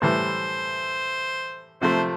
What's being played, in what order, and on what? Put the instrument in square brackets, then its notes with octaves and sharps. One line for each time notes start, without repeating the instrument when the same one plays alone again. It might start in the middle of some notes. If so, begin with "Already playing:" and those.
[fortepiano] A2 E3 G3 [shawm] C5
[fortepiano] C3 F3 A3 [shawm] C5